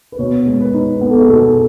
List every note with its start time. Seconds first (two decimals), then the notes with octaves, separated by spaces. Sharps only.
0.12 B4
0.19 B2 C#5
0.46 G#3
0.61 B4
0.74 D#4
1.01 B3 B4
1.10 A4
1.21 G#4
1.29 B2 A4